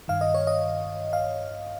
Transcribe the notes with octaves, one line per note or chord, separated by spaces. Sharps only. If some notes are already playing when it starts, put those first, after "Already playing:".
G2 D#3 F5
D#5
C#5
D#5
F5